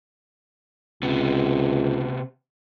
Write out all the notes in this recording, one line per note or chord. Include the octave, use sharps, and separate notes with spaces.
C#2 C3 B3